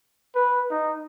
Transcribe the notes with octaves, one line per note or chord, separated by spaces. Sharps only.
B4
D#4